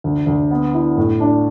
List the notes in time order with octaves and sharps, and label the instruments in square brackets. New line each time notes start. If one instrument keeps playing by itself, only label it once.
[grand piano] D2
D2
B3
E4
A2
D4